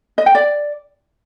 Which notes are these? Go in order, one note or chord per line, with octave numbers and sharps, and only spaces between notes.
D#5
G5
D5